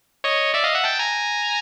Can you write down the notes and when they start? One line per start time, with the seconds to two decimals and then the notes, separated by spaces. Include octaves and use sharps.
0.24 C#5 D#5
0.54 D5 E5
0.64 D#5 F5
0.74 E5 F#5
0.84 G5 A5
0.99 G#5 A#5